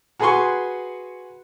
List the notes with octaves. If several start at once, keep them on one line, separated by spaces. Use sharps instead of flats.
F#4 G#4 B4 G#5 C6 C#6